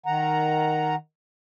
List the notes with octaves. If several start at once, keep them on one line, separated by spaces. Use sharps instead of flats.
D#3 F#5 A#5